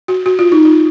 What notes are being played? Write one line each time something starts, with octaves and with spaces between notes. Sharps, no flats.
F#4
F#4
F4
D#4
F4